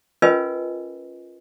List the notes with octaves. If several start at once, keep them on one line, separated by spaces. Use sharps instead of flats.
C#4 F4 A#4 B4 D#5 G#5